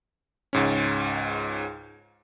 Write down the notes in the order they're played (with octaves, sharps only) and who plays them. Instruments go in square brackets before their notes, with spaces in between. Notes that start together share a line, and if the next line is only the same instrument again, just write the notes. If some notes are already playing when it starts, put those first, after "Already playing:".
[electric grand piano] C#2 G#2 C#4